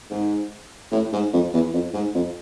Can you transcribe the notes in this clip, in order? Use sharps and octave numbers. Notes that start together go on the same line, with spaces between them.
G#2
A2
G#2
F2
E2
F2
G#2
F2